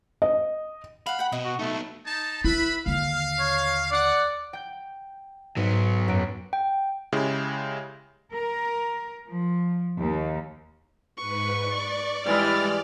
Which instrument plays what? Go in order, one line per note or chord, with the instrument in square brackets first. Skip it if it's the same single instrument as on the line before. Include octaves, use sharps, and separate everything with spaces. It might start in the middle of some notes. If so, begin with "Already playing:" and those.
[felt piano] D#5
[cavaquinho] F5 F#5 [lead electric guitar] B5
[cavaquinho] F#5 G5
[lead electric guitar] B2 [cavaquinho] D#5 D#6
[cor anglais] F#4
[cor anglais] A3 [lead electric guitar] B3 D#4
[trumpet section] D#4 A5
[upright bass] E4 [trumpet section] B4 E5 B5
[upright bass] D#2 D3 [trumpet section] F5
[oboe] C#5
[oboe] D5 [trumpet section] F#5
[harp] G5 G6
[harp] G#2 [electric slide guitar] F#3 B3
[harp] F#2 B4 D7
[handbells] G5
[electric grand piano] C#3 G#3 E4 G4
[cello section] A#4
F3
D#2
[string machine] G#2 B4 [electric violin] C#6
[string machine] D5
[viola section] E3 G3 G#3 [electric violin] F6 A6